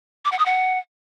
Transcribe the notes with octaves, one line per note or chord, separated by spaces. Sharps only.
D6
F#5
D#6
F#5